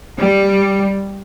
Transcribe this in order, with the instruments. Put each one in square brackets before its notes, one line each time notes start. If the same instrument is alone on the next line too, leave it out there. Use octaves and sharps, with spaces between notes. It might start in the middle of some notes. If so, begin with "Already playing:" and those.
[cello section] G3